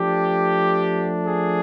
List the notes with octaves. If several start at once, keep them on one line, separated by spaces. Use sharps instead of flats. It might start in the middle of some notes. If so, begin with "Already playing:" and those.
Already playing: F3 A3 D4 G4
G#4